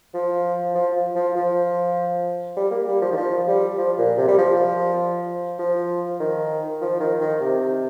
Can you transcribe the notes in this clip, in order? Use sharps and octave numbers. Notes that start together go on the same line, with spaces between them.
F3
F3
F3
F3
G3
A#3
G3
F3
D#3
F3
G3
F3
A#2
C3
G3
F3
F3
D#3
F3
D#3
D#3
C3